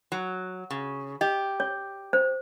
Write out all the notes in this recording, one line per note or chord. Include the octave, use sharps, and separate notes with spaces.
F#3
C#3
G4 D#5
C#5
C5